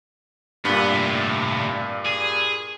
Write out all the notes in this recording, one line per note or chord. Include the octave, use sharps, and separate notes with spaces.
G2 A#2 B3
A2 C3
G#4